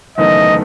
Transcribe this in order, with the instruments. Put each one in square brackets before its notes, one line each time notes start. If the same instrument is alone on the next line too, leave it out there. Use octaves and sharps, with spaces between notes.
[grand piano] F#1 E2 D#3 A3 D#4 [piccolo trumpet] D#5